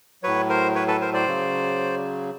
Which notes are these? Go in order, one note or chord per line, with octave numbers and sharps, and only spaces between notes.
A2 F#3 B4 C#5
A#4 C5
B4 C#5
A4 B4
A#4 C5
C5 D5
C#3 F#3